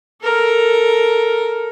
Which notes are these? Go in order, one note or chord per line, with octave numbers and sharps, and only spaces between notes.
A4 A#4